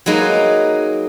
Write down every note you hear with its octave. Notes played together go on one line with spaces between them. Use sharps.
F#3 G#3 A#3 D#4 B4